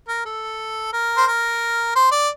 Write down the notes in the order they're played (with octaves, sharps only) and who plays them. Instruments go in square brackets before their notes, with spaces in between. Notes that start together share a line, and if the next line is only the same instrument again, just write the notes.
[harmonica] A#4
A4
A#4
C5
A#4
C5
D5